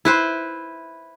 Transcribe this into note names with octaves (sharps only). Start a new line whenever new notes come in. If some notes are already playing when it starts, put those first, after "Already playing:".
E4 B4 C5